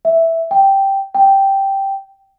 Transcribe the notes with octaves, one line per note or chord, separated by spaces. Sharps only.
E5
G5
G5